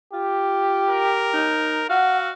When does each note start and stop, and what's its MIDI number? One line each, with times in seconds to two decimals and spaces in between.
0.13 1.10 65
0.13 1.49 67
0.89 1.89 70
1.34 1.84 63
1.90 2.33 66
1.90 2.32 77
1.90 2.18 78